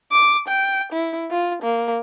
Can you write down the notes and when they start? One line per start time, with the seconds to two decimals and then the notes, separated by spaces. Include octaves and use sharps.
0.12 D6
0.48 G5
0.93 E4
1.31 F4
1.62 A#3